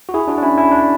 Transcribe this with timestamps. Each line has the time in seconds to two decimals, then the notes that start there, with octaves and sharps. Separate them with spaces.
0.09 F#4
0.14 E4 G#4
0.28 D4 F#4
0.38 D4
0.42 C#4 E4
0.58 C#4 E4
0.71 D4